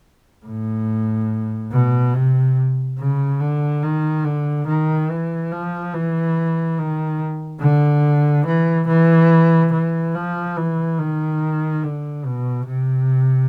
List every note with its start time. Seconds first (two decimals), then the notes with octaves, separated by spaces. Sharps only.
0.45 A2
1.72 B2
2.14 C3
2.98 C#3
3.40 D3
3.83 D#3
4.25 D3
4.67 D#3
5.10 E3
5.51 F3
5.94 E3
6.78 D#3
7.62 D3
8.46 E3
8.88 E3
9.73 E3
10.15 F3
10.57 E3
10.99 D#3
11.83 D3
12.25 B2
12.68 C3